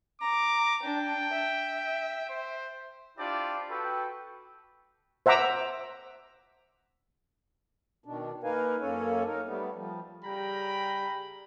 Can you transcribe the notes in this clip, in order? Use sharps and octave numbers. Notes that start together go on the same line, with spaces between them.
A#5 D6
D4 G5
E5
C5
D4 E4 F4 G4 C5 D5
F#4 A4 B4 G5
C5 E5 F#5 A#5 D6 E6
B2 D#3 D4
A#3 D#4 A#4 B4 F5 G#5
F#2 A#3 C#4 A4 C#5 G#5
D#4 A#4
G3 A3 B3
F3 G3
C#3 G3 G5 A#5 B5